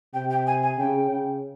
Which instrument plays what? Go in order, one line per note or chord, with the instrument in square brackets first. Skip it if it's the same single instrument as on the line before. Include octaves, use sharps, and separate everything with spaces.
[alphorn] C3 [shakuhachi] G5
[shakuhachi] G5
G#5
G#5
[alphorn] C#3 [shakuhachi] G5
[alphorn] C#3